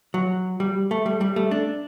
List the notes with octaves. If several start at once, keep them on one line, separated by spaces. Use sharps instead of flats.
F#3
G3
A3
G3
G3
A3
D4